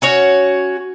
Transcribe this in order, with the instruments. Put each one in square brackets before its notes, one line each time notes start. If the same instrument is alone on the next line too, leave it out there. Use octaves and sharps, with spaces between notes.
[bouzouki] C#4 F#4 C#5